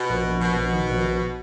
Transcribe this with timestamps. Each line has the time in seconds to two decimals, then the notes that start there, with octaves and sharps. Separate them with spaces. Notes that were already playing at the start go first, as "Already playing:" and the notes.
Already playing: B2
0.10 A#1
0.26 A#1
0.41 A#1 B2
0.57 A#1
0.73 D#3
0.89 A#1
1.05 A#1